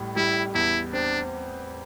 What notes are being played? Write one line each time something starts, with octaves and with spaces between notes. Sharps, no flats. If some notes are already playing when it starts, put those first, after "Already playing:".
Already playing: A1 A2 G3
G3 E4
E2 E4
C4 D4